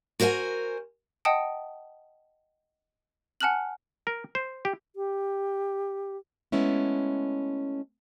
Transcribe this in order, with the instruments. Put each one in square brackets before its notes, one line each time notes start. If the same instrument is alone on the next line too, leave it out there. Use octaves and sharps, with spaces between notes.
[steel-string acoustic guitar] F#4 A#4 C5 E5 G#5
[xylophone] D#5 F#5 G5 A5 D#6 D7
F#5 G#5 A5 F6 F#6 F#7
[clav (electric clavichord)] A#4
C5
G4
[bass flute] G4
[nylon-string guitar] G#3 A3 B3 C#4 E4